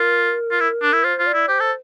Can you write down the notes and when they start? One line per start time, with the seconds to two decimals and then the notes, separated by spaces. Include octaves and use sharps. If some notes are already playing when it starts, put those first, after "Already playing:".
Already playing: F4 A#4
0.51 F4
0.60 E4
0.82 D4
0.93 E4
1.04 F4 C5
1.19 F4
1.26 D5
1.34 E4
1.48 G4 C5
1.60 A4